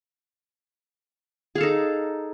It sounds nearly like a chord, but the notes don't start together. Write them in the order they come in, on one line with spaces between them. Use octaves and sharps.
G#4 F5 A4 D#4